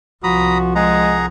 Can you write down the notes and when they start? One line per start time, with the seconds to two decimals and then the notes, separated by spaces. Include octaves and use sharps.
0.24 C2 F3 F#4 A#5 B5 D#6
0.75 G#3 G#4 F#5 A#5